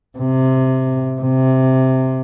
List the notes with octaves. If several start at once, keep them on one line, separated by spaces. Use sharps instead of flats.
C3
C3